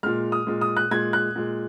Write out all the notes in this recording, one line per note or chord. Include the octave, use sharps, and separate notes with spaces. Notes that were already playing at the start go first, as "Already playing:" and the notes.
A#2 G#3 F6
D#6
A#2 G#3
D#6
F#6
A#2 G#3 G#6
F#6
A#2 G#3